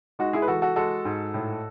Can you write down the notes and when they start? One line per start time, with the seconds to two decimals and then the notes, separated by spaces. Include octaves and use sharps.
0.19 G#3 D#4 F#4
0.33 E4 G#4
0.42 B4
0.48 E3 F#4 A4
0.62 F#4 A4
0.76 G#3 F#4 A4
1.05 G#2
1.34 A2